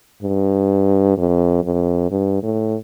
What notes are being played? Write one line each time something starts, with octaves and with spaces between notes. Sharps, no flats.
G2
F2
F2
G2
A2